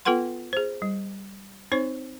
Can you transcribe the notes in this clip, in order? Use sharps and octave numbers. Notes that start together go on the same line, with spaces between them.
B3 F4 A4 B4 F#5 C6
G#4 C5
G3
C4 D#4 C5 C#5 C#6